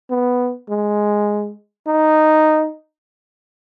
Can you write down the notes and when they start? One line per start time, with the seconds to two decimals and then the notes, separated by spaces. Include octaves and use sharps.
0.10 B3
0.69 G#3
1.87 D#4